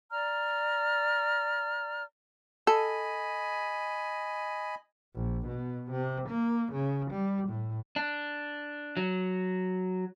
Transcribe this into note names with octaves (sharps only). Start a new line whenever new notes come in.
D5 A#5 F6
A4 D#5 G#5 B5
A#1
B2
C3
A#3
C#3
G3
A2
D4
F#3